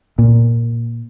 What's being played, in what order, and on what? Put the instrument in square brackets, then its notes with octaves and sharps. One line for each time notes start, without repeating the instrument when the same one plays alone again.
[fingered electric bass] A#2